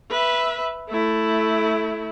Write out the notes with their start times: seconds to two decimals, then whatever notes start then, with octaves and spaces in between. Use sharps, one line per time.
0.10 B4 E5
0.89 A3 E4